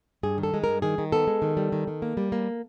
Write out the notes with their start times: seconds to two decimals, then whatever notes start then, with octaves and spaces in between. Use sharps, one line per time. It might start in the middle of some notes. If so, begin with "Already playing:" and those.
0.23 G2 G#4
0.38 D#3
0.43 A4
0.54 G#3
0.64 G2 A#4
0.82 D#3 G#4
0.98 D#3
1.12 B3 A4
1.27 G#3
1.42 D#3
1.57 G3
1.72 D#3
1.88 D#3
2.02 A#3
2.17 G3
2.32 A#3